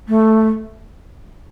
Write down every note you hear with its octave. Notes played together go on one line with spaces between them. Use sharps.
A3